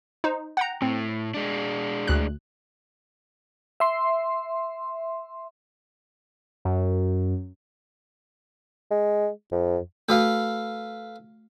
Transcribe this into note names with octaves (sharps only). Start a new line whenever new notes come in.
D#4 C5
F#5 G5 A#5
A2 C4
G#3 D4
D2 F#6
E5 C6
F#2
G#3
F2
A3 F#4 A4 B4 F5